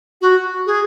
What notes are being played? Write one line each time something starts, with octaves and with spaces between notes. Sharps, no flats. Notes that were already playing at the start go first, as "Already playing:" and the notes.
F#4
G#4